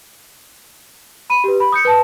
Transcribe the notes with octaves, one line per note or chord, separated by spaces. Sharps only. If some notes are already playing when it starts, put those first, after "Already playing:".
B5 D#7
G4 B4
B5
D#6 G6 C#7
B4 A5